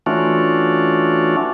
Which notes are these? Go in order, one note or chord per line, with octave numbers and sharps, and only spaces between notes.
E3 A3 C#4 D4 F4 F#4